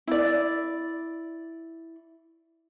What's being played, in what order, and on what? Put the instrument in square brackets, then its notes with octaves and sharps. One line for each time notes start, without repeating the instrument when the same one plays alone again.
[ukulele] E4 D5